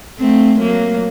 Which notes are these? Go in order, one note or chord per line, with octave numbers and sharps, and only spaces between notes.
A3 C4
F#3 A#3